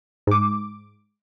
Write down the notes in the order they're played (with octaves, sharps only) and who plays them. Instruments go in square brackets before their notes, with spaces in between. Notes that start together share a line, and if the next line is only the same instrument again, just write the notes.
[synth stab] G#2 D6